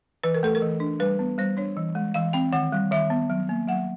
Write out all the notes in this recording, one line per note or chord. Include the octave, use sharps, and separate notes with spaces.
E3 B4
A#4
A3 A4
A#4
E3
D4
G3 B4
B3
G3 C5
D4 C#5
E3
G#3
E3 F5
C4 G5
D#3 F#5
G3
D#3 E5
B3
F#3
A#3
F#3 F#5